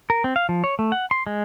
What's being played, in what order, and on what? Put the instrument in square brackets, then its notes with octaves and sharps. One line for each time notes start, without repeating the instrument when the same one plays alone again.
[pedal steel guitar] A#4
C4
F5
F3
C#5
A3
F#5
C6
G#3